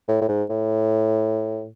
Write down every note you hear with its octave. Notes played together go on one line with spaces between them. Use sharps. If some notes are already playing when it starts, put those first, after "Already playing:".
A2
A2
G#2
A2